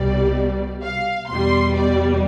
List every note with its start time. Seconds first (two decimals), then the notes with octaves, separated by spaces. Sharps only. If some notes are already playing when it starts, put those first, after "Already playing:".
Already playing: C2 B2 G3 D5
0.82 F5
1.28 E2 B2 G3 C6
1.75 D5